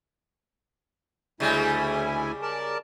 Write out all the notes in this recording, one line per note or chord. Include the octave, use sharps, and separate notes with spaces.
D2 C#3 G3 G#3 E4 G#5
A#4 D5 A5